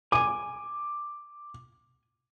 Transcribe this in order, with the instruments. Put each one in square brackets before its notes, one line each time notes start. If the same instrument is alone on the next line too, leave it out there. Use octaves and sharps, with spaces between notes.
[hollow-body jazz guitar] G#5 [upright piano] D6